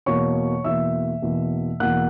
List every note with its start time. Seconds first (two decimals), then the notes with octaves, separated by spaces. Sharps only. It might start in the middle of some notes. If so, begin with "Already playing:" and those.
0.06 E2 B2 A#3 C#5 C#6
0.64 E2 B2 A#3 E5 E6
1.22 E2 B2 A#3
1.80 E2 B2 A#3 F#5 F#6